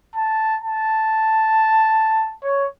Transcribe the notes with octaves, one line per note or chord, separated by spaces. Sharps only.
A5
A5
C#5